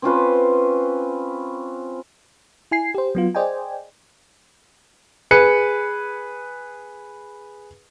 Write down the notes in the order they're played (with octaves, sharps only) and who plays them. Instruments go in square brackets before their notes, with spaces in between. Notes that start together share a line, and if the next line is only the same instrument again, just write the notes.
[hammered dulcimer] C4 C#4 F4 B4
[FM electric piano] E4 G#5 C7
G4 C5
F#3 B3 F4
G#4 C5 D5 D#5 G5 G#5
[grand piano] G#4 B4 C#7